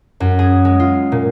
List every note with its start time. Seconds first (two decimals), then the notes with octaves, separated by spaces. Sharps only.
0.20 F#2
0.39 G#4
0.65 G#3
0.80 F4
1.12 A#2